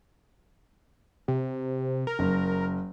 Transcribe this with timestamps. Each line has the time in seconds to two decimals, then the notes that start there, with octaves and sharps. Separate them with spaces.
1.28 C3
2.07 A#4
2.19 F#1